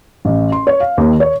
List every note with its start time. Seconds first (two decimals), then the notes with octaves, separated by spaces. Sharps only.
0.25 A1
0.52 C6
0.67 C#5
0.80 F5
0.98 D#2
1.20 C#5